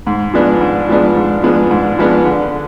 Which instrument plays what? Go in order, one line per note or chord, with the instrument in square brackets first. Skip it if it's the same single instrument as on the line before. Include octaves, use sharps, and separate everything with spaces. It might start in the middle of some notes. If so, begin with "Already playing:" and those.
[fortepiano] G#2
F3 G#3 B3 D4
G#2
F3 G#3 B3 D4
G#2
F3 G#3 B3 D4
G#2
F3 G#3 B3 D4
D3